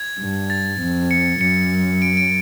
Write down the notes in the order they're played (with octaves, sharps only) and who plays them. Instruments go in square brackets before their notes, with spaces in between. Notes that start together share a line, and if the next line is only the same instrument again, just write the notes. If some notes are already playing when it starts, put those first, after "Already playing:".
Already playing: [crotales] G#6
[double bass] G2
[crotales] A6
[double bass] F2
[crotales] C#7
[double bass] F#2 [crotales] C#7
[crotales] D7
D7